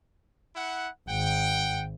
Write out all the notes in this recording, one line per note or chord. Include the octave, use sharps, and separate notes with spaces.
E4 F#5
G#1 F#5 G5